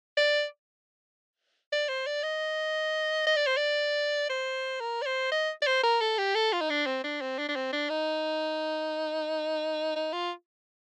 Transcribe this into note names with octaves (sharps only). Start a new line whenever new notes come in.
D5
D5
C5
D5
D#5
D#5
D5
C5
D5
C5
A#4
D5
C5
D#5
D5
C5
A#4
A4
G4
A4
F4
D#4
D4
C4
D4
C4
D4
D4
C4
D4
D#4
D#4
F4